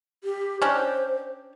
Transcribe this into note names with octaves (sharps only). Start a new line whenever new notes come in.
G4
C#4 D4 G4 C5